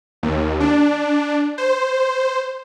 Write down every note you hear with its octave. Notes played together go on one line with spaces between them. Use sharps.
D#2
D4
C5